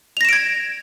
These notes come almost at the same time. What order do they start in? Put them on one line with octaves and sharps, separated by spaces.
F7 A#6 E7 D7 G#6